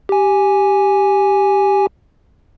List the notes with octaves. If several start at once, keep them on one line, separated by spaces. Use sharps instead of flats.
G4 G#5